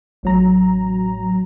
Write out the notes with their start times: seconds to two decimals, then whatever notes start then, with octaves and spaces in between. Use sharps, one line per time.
0.23 A1 F#3 A#5